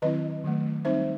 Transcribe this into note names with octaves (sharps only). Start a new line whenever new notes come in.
D#3 F#3 C4 E4 B4 D#5
D#3 F#3 A3
G3 C4 D#4 C5 E5